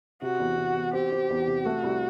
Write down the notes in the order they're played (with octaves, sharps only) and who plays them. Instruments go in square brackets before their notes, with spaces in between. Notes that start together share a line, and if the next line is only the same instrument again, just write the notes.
[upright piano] C3 [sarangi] F#4
[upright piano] E2
C3
E2
[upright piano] C4 [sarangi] G4
[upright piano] C4
E2
C3
[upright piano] A3 [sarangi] F#4
[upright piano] C2